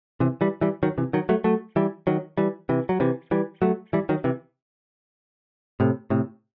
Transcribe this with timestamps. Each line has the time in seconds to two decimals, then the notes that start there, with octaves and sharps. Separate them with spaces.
0.20 C3 E3
0.41 E3 G3
0.61 E3 G3
0.83 D#3 F#3
0.98 C3 E3
1.13 D#3 F#3
1.29 F#3 A3
1.44 F#3 A3
1.76 E3 G3
2.07 D#3 F#3
2.38 E3 G3
2.69 C3 E3
2.89 F#3
3.00 C3 E3
3.31 E3 G3
3.62 F#3 A3
3.93 E3 G3
4.09 D#3 F#3
4.24 C3 E3
5.80 A2 C3
6.10 A2 C3